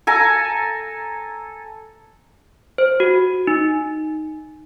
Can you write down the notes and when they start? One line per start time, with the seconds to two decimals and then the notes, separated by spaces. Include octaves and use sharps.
0.07 A4 G#5 A#5
2.78 C5
3.00 F#4
3.47 D#4